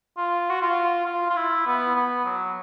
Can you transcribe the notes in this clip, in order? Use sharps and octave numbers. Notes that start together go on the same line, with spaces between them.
F4
F#4
F4
F4
F4
E4
B3
B3
F#3